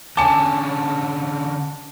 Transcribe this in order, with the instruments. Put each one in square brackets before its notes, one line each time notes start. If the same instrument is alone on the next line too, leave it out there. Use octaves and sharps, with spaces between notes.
[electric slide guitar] D3 C#4 [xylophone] G#5 D6 [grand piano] A5